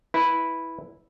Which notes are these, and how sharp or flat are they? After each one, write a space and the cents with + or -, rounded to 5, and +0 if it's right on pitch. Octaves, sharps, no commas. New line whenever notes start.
E4 -5 B4 +0